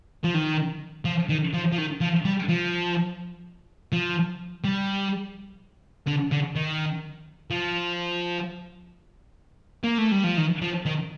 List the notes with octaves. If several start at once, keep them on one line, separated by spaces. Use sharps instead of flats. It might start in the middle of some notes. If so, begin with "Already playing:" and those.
F3
D#3
F3
D#3
F3
F3
D#3
F3
G3
F3
F3
G3
D3
D3
D#3
F3
A#3
A3
G3
F3
D#3
F3
D#3